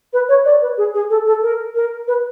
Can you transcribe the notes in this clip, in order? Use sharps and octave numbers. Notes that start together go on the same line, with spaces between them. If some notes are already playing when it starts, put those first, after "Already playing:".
B4
C#5
D5
B4
G#4
G#4
A4
A4
A#4
A#4
B4